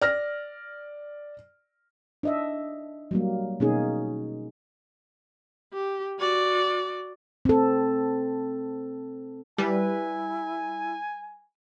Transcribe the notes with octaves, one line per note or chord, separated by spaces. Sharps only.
D5 F6 A#6
D4 D#5 E5
F#3 G3 A#3
B2 A#3 C#4 D#4 G#4
G4
F#4 D5
C4 A4
G3 E4 B4 G#5